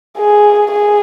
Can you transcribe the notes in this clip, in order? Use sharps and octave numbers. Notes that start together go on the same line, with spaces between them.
G#4
G#4